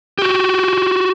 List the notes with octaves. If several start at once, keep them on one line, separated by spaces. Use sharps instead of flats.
F#4 G4